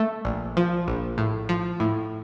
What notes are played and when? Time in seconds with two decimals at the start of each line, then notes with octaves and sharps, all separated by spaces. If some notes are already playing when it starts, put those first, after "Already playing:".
Already playing: A3
0.25 A#1
0.57 F3
0.88 A#1
1.18 A2
1.49 F3
1.80 A2